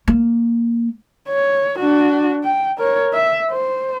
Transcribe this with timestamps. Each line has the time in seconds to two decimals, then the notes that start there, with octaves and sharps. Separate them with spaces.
0.08 A#3
1.28 C#5
1.79 D4 F#4
2.44 G5
2.78 A#4 C#5
3.13 E5
3.51 C5